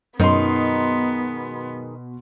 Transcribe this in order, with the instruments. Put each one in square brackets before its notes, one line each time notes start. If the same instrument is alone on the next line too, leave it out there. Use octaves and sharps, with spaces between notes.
[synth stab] F#2 [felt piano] B2 C6 [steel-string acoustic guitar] D#3 G#3 D#4 [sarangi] B3